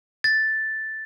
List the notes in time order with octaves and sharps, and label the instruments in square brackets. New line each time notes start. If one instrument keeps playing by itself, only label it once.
[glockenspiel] A6